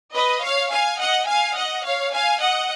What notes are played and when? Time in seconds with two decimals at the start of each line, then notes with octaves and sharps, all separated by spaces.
0.14 B4 D#5
0.42 C#5 F5
0.70 F5 G#5
0.98 D#5 F#5
1.26 F5 G#5
1.55 D#5 F#5
1.83 C#5 F5
2.12 F5 G#5
2.40 D#5 F#5